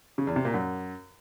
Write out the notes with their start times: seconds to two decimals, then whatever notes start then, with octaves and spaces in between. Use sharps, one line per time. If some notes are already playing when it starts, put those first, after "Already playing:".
0.18 C#3
0.27 E2
0.36 C3
0.45 A#2
0.54 F#2